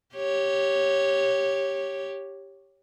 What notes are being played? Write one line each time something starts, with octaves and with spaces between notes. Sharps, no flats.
G4 C#5